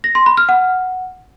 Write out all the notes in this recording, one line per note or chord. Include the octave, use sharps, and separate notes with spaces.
A#6
C6
B5
F6
F#5